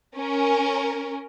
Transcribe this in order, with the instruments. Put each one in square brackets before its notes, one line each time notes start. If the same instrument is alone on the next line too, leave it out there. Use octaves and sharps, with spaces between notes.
[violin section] C#4 A#4